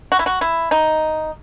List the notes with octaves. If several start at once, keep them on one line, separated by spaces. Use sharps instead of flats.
F#4
E4
F#4
E4
D#4